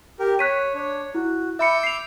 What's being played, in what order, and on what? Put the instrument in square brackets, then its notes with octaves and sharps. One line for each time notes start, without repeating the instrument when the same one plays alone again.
[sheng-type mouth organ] G4 A#4
[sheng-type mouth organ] C#5 [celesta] F#6 B6 D#7
[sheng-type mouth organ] D4 C#5
[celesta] E4 [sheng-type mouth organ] F#4
[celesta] E5 B5 C#7 [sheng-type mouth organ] D6 E6 G6
[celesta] C7 F7